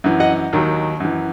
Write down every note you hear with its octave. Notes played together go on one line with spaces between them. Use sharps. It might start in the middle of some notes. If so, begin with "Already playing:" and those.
F#2 E3
D#5 F#5
D#2 D#3 F#3
F#2 E3